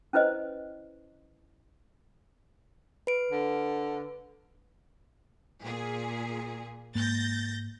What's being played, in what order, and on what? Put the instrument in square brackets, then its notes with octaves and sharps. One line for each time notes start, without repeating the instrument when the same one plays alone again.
[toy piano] C#4 E4 B4 C5 D#5
[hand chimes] B4 D7
[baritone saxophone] D3
[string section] A#2 G#4
[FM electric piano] G#2 A#3 [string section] G6 A6 A#6